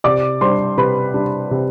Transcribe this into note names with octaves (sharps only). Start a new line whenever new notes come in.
C3 D5 D6
G3 D4 C5 C6
C3 B4 B5
G3 D4
C3